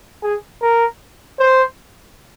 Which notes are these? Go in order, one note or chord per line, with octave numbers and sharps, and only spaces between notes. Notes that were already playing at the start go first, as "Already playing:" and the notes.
G#4
A#4
C5